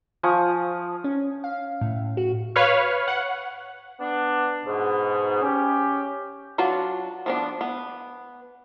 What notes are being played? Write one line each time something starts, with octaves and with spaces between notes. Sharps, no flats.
F3 G#5 C#6 D#6
C#4
F5
A2
F#4
B4 C#5 F5 C#6 F6
F#5
B3 D4
G#2 B2
C#4 G4
F#3 D4 F4 F#4 B4
F3 B3 D4
B3